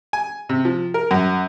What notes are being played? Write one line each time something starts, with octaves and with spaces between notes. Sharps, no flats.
G#5
C3
F3
A#4
F#2